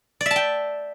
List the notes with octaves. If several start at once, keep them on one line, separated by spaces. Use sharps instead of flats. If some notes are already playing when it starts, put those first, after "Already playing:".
D5
E5
A5
G5